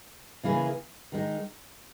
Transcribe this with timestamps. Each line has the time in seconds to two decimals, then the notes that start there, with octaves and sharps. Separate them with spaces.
0.43 C#3 E3 A#3 E4 G#4
1.12 D#3 G#3 D#4